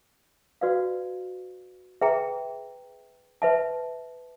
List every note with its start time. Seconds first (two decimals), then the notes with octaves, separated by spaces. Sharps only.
0.61 F#4 B4 D5 F5
2.01 G#4 B4 E5 G5 A#5
3.42 B4 E5 A5